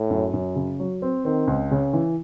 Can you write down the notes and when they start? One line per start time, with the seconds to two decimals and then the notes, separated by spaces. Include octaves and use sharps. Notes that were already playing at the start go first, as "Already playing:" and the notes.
Already playing: A2
0.10 F#2
0.34 F#2
0.56 C#3
0.80 F#3
1.02 C4
1.25 D#3 C4
1.47 C#2
1.71 C#3
1.93 E3